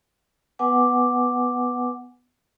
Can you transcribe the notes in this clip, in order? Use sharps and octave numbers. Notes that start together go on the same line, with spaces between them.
B3 B4 F#5 G#5 D6